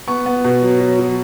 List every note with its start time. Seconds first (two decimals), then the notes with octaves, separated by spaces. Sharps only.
0.08 B3 C#6
0.26 B3
0.44 B2
0.62 F#3
0.80 F#3
0.99 F#3